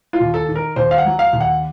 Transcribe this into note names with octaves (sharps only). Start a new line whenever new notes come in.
F4
D#2
A4
D#3
A#4
D#2 C5
F5
F#5
F#3
F5
D#2
F#5